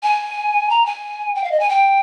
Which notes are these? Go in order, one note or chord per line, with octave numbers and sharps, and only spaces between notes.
G#5
A#5
G#5
G5
F5
D#5
G#5
G5